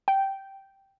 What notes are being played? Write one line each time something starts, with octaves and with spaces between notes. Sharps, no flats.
G5